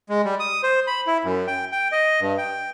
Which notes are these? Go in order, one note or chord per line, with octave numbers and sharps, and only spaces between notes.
G#3
G3
D#6
C5
B5
E4
F#2
G5
G5
D#5
G2
G5